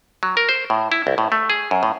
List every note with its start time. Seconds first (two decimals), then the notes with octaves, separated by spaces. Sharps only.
0.23 F#3
0.37 A#4
0.49 C5
0.70 A2
0.92 E4
1.07 C2
1.18 A2
1.32 A3
1.50 G#4
1.71 F#2
1.83 A2